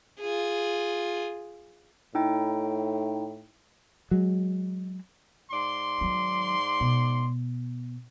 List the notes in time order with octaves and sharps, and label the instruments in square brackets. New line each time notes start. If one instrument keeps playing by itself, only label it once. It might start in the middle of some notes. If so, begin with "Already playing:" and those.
[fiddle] F4 G#4
[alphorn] A2 [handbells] D#4 E4 G5
[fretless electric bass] F#3 G#3
[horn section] G#2 D5 C6
[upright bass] D#3 F#3
B2